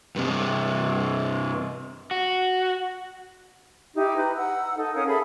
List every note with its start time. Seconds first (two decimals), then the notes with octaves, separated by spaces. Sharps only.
0.16 G2 C3
2.11 F#4
3.95 D#4 E4 G4
4.16 B4 A#5
4.36 F#5 E6
4.76 D#4 A4
4.94 C#4 A#4 F5 D#6
5.07 G#4 A4 E5 B5